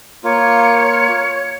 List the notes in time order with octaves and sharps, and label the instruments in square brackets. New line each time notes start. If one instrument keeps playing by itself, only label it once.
[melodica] A#3 F4 [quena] C#5